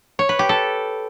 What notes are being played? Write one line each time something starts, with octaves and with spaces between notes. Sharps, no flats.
C#5
B4
G4
A4